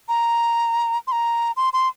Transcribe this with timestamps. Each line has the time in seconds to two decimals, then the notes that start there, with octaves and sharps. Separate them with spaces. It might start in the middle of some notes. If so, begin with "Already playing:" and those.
0.09 A#5
1.07 C6
1.12 A#5
1.57 C6
1.73 C6